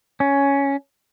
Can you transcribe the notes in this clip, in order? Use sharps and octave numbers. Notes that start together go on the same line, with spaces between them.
C#4